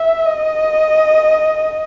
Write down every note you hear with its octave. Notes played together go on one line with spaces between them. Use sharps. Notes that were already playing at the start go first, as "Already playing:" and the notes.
Already playing: E5
D#5